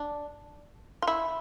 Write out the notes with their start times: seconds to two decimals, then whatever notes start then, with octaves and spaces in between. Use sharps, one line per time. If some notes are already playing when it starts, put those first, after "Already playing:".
Already playing: D4
1.02 F4
1.08 E4